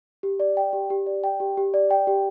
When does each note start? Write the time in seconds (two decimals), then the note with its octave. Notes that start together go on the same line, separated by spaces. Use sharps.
0.23 G4
0.40 D5
0.57 G5
0.73 G4
0.90 G4
1.06 D5
1.24 G5
1.40 G4
1.57 G4
1.74 D5
1.91 G5
2.07 G4